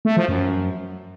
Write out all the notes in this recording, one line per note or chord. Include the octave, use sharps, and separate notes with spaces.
A3
F3
F#2